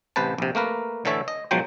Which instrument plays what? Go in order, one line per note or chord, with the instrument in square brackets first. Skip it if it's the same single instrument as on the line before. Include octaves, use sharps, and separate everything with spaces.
[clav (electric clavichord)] A1 C3 B4 C5 A5
A#1 C3
A3 A#3 A#4 B4
A2 D3 E3 A4 C#5 E5
D#5
G#2 B2 F3 F#3 C5 G5